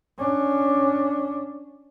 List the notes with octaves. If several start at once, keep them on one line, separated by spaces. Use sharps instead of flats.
C#4 D4